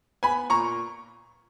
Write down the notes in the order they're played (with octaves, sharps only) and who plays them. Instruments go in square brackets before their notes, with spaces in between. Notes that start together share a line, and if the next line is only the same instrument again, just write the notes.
[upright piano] B3 G#5 B5
A#2 A#5 C#6